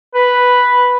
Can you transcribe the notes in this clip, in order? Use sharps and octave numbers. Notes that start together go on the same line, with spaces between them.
B4